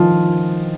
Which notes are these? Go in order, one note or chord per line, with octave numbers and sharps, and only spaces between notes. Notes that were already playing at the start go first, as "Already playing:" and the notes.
Already playing: D#3 F3 F4